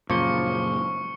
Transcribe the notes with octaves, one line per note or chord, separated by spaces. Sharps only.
F#2 A#2 C#3 F3 A#3 C#6 C#7 G7